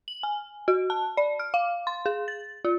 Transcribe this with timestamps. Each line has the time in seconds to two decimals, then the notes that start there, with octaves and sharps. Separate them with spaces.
0.08 F#7
0.23 G#5
0.68 F#4
0.90 A5
1.17 D5
1.39 F6
1.54 F5
1.87 C6
2.06 G#4
2.28 A6
2.65 F4